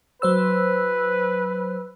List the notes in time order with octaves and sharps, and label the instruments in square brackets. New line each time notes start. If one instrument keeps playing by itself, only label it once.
[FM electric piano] F#3 C5 E6 [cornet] B4